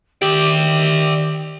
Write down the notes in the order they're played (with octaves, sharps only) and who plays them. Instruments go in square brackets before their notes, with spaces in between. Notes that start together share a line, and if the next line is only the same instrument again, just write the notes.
[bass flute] D#3 [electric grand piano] G4 [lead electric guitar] D5 E5